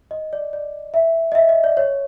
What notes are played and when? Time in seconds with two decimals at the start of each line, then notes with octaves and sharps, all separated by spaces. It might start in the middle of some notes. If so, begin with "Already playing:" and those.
0.11 D#5
0.33 D5
0.53 D5
0.94 E5
1.32 D#5
1.35 E5
1.49 D#5
1.64 D5
1.77 C#5